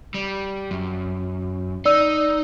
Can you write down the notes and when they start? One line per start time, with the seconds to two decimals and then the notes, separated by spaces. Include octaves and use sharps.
0.14 G3
0.71 F#2
1.85 D#4 D5 E6